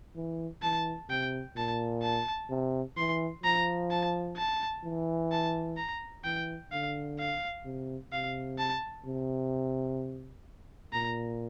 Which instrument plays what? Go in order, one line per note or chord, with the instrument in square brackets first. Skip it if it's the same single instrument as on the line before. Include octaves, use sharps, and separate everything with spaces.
[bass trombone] E3
[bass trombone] E3 [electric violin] A5
[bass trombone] C3 [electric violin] G5
[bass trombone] A#2 [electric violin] A5
[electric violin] A5
[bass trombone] C3
[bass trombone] E3 [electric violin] C6
[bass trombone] F3 [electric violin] A#5
[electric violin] A5
A5
[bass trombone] E3
[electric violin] A5
A#5
[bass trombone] E3 [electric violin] G5
[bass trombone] D3 [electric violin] F5
[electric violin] F5
[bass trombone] C3
[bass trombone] C3 [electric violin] F5
[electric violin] A5
[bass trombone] C3
[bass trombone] A#2 [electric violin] A#5